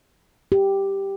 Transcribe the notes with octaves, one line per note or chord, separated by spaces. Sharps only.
G4